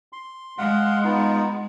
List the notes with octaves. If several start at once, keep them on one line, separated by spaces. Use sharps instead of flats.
C6
G#3 F5 F#5 C6
B3 D#4 F4